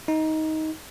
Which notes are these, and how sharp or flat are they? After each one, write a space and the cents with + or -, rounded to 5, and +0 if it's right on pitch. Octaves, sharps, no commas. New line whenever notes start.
D#4 +15